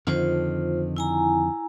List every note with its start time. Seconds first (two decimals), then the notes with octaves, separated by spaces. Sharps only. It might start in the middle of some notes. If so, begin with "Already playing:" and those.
0.07 F2 D3 D#3 F4 C5
0.97 E4 G#5 A#5